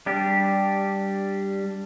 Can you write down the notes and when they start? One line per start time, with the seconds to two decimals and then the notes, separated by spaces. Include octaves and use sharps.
0.06 G3 D4 G4